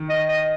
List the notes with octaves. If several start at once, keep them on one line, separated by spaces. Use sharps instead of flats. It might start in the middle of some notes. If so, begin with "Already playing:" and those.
Already playing: D#3
D#5
D#5